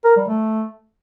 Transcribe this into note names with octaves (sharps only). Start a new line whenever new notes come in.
A#4
G3
A3